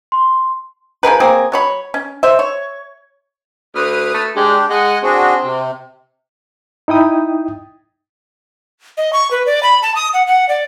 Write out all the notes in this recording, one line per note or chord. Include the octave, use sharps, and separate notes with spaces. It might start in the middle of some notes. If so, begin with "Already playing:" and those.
C6
F3 G#4 A#4 B4
A#3 C4 G#4
F#3 C#5 B5
C#4
C5 E5
C#5
D2 B4 D#6 F6
A3
G#3 D4 G4
G#3 D#5 F#5 G#5
C4 D4 F#4 G#4
C3
D#4 E4 G5 D#6
D#5
C#6
B4
D5
B5
A5
D#6
F#5
F#5
D5